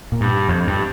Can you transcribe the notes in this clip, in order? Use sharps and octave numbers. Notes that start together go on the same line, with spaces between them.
A#2
G2
F2
G2